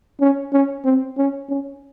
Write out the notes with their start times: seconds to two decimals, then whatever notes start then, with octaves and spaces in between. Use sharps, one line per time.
0.20 C#4
0.52 C#4
0.84 C4
1.17 C#4
1.49 C#4